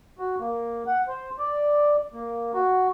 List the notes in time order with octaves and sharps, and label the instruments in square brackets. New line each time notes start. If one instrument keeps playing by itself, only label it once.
[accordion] F#4
A#3
F#5
C5
D5
A#3
F#4